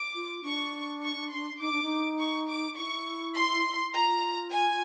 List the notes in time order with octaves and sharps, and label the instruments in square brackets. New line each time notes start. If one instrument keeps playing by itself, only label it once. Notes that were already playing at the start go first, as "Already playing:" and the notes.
Already playing: [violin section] D6
[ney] F4
[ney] D4 [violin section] C#6
[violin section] C#6
C6
[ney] D#4 [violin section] D6
[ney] D4
D#4
[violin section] C#6
D6
[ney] E4 [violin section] C#6
[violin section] C6
[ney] F4 [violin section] A#5
[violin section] G#5